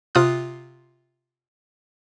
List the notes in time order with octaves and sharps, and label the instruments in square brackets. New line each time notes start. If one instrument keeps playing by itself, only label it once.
[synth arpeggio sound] C3 F4 D#6 F#6